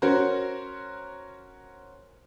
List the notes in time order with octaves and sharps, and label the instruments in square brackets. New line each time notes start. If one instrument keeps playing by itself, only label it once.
[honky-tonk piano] C#4 F#4 A#4 C5